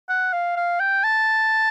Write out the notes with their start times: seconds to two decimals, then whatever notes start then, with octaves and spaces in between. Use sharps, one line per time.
0.09 F#5
0.33 F5
0.56 F5
0.80 G5
1.04 A5